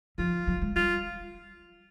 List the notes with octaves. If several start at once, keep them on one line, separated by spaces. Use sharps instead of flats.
F3 F4
F#3
G#3
G3 F4